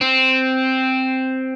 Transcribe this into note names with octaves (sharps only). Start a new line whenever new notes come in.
C4